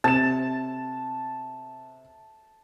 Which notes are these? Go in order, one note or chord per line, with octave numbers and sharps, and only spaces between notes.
C3 A5 E7